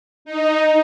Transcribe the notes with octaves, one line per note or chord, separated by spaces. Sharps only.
D#4